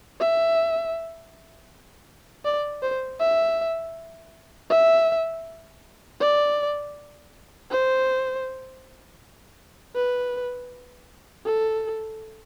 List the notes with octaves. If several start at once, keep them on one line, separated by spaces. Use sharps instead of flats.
E5
D5
C5
E5
E5
D5
C5
B4
A4